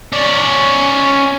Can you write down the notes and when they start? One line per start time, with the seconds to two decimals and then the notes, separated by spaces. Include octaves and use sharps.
0.12 C#4 D5